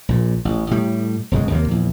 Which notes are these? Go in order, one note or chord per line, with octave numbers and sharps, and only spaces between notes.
A#1 A#2
A1
A2 G3
E1 F#2 C#3 G#3
D#2 C3 G3 A#3
A#1 E2